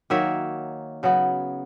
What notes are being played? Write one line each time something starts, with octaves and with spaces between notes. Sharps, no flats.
D#3 F#3 A#3 C#5 E5
C#3 F#3 B3